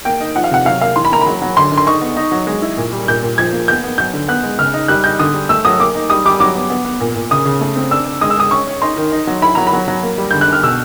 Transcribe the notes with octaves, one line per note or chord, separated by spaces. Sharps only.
A#3 G5
D#4
F3 F#5
F5
C3 F#5
F#3 F5
A#3 F5
E3 C6
B5
A#3 A#5
F#3 B5
F#3
D3 C6
D3
C6
D#4 C#6
B3
D#4
F#3
G#3
E4
A#2
G3
A#2 G6
A#2
F3 G#6
A#3
B3 G6
B3
F#3 G6
D3
B3 F#6
G#3
C#3 F6
D#4
G3 F#6
D#4 G6
D3 D#6
G3
A3 E6
F#3 D#6
A#3 D6
D#4
G3 D#6
G3 D6
F#3 D6
B3
B3
B3
A#2
A#2
C#3 D#6
C#3
A3
C4
D4 E6
D4
G#3 D#6
E6
G#3 D#6
C#4 C#6
C#4
D#4 C6
D#3
D#4
F#3
E4 B5
F#3 A#5
B5
F#3
F#3
A#3
G3
D3 G6
F#6
D3 F6
B2 E6